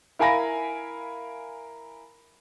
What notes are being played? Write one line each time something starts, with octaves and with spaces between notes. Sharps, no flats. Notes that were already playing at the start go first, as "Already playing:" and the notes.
E4 A#4 F5 G#5 B5 A#6